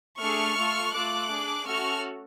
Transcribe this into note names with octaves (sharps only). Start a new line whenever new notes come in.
A3 D4 G#4 C#6 F6
A3 F4 A4
A3 F4 A4 D6 F#6
D4 G#4
A3 C#4 F#4 A4 C#6 F6